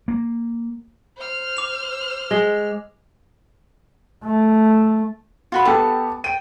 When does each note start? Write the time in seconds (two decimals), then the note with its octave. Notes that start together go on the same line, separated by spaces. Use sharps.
0.08 A#3
1.17 C5 F6
1.57 D6 F7
2.31 G#3
4.24 A3
5.52 F4 F#4 B5
5.65 B3 G4 A4 A5
6.24 G5 D7 D#7